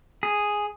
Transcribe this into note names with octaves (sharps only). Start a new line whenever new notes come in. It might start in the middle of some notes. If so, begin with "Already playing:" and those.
G#4